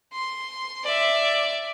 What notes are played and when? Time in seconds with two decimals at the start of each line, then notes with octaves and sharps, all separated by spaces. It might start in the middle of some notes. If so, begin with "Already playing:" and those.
0.13 C6
0.84 D5 E5